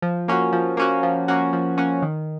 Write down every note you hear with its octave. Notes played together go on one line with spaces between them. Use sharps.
F3
A#3 C#4 F#4
F3
A#3 C#4 F#4
F3
A#3 C#4 F#4
F3
A#3 C#4 F#4
D#3